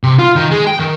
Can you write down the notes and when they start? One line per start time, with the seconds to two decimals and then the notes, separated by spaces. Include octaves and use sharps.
0.04 C3
0.19 F4
0.36 D#3
0.51 G#3
0.67 G5
0.79 D#3